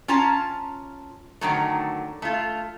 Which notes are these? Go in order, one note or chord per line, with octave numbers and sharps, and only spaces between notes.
C#4 F4 A5 A#5
D3 D#3 F#3 A3
A3 F4